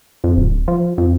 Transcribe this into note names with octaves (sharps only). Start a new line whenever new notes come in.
F2
D1
F3
F2